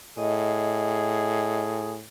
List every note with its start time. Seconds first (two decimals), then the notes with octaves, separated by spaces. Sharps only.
0.18 A2 G#4 D#5